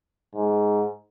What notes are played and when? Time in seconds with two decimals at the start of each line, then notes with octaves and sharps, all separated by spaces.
0.35 G#2